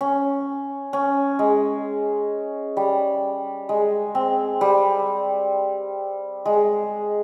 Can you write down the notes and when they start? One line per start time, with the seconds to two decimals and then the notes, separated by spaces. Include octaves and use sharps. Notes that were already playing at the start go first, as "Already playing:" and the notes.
0.01 C#4
0.93 C#4
1.39 G#3
2.77 G3
3.69 G#3
4.15 C4
4.61 G3
6.46 G#3